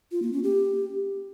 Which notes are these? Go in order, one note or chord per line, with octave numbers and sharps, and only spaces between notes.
F4
A#3
C#4
G4